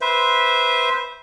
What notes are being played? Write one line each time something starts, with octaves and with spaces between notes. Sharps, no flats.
B4 C5 E5